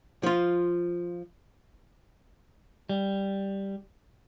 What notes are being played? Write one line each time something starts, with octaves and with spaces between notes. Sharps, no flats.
F3 F4
G3